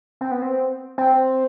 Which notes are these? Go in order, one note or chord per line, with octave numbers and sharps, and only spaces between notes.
C4
B3
C4
C4